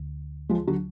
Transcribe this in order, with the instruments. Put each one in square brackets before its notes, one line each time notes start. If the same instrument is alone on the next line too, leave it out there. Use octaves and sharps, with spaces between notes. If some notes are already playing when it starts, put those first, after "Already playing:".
Already playing: [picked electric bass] D2
[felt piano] F3 G#3
D3 F#3